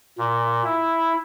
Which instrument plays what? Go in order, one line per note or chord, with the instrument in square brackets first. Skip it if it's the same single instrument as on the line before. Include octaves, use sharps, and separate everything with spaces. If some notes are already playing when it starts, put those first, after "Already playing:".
[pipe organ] A#2
E4